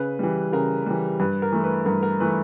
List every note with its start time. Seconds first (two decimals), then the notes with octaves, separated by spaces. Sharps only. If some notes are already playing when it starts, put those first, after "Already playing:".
Already playing: C#3 B4
0.19 E3 G3
0.52 C#3 A#4
0.86 E3 G3
1.19 G2 B4
1.42 A#4
1.52 E3 A3
1.64 B4
1.86 G2 A#4
2.03 A#4
2.20 E3 A3 B4